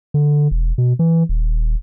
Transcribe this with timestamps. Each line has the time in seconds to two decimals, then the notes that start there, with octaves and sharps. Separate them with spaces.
0.14 D3
0.51 E1
0.78 B2
0.99 E3
1.29 D#1